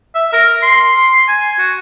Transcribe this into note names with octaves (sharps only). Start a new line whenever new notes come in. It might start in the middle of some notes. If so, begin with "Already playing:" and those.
E5
A#4
C6
G#5
F#4